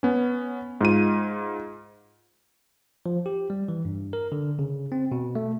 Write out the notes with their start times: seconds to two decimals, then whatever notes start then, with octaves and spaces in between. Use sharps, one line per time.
0.03 B3 C#4
0.81 G#2 F4 D#7
3.06 F3
3.26 G4
3.50 G3
3.69 E3
3.85 G2
4.13 A#4
4.32 D3
4.59 C#3
4.92 C4
5.12 B2
5.35 A3